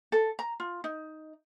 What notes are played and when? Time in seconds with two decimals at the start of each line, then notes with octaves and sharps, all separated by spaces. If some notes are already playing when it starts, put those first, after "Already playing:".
0.12 A4
0.39 A#5
0.60 F4
0.84 D#4